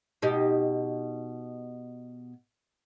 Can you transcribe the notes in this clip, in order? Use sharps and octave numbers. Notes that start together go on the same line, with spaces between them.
B2 D#4 G4